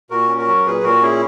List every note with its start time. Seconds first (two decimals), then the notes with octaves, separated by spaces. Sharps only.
0.10 A#2 F#4 A#4
0.29 C#4
0.38 F#4 A#4
0.47 F#3
0.66 A#2 G#4 B4
0.84 A#2 F#4 A#4
1.02 C#4 E4 G#4